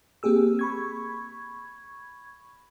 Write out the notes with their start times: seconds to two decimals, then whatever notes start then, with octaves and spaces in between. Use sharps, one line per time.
0.23 A#3 C4 G4 G#4 E6
0.59 B5 C#6 G#6